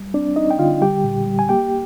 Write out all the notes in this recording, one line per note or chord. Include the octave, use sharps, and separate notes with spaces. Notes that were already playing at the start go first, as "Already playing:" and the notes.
Already playing: G3
C4 D4 D5
C4 D#4 D#5
G5
D3 F4 F5
G3 G4 G5
A#2
G3
G#5
A#3 G4 G5